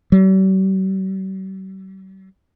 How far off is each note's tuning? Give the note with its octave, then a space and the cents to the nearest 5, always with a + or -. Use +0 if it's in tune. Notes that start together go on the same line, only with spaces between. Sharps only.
G3 -45